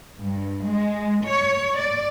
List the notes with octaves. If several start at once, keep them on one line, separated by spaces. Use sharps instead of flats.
G2
G#3
C#5
D5